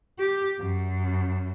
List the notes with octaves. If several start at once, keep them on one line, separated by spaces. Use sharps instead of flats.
G4
F#2